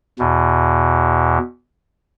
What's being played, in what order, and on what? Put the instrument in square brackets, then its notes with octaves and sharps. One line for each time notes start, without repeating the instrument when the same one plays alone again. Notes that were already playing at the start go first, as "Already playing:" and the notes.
[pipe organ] E2 B2